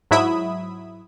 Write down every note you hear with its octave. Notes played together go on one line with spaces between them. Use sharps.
G#2 F#3 E4 E5 B5 D#6